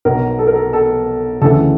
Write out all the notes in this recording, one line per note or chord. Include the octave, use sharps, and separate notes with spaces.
B1 B2 A#4
A4
A#4
A4
A4
D2 C#3 E3 A4